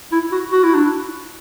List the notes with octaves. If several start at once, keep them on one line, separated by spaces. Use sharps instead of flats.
E4
F#4
F#4
E4
D4